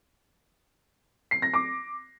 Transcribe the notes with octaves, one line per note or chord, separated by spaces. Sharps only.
C7
A#6
D6